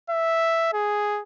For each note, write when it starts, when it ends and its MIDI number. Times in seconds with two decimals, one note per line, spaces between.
0.10 0.70 76
0.73 1.21 68